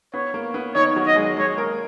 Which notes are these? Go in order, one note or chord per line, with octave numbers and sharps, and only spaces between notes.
B3 C#5
A#3
B3
D#3 D#4 C#5
F#3 F#4
D#5
G#3 G#4
G#3 G#4 C#5
A#3 A#4